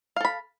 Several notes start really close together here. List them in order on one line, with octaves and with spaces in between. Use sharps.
F5 A4 B5